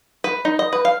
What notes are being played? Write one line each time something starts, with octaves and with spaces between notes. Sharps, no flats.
B4
D#4
D#5
B4
F5